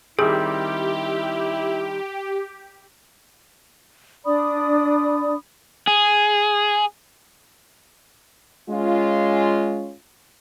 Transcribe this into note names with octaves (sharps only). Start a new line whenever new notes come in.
D#3 G3 C4 E4 G4 G#4
D4 D5 B5 D#6
G#4
G#3 C#4 F4